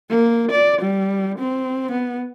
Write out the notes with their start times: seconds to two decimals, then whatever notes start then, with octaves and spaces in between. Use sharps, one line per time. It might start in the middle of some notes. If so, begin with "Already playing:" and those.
0.10 A#3
0.51 D5
0.81 G3
1.39 C4
1.91 B3